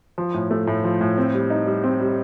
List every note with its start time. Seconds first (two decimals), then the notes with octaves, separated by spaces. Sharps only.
0.18 F3
0.34 A2
0.51 A3
0.67 A2
0.84 F3
1.01 A2
1.18 C4
1.34 G3
1.50 D#4
1.66 G3
1.84 C4
2.00 G3